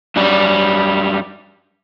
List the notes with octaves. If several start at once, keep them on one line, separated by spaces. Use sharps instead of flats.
F#2 G3